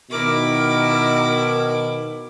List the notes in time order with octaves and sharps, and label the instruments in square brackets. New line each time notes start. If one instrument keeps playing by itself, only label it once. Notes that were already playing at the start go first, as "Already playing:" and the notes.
[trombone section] B2 D#3 [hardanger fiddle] E4 D6 [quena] A#4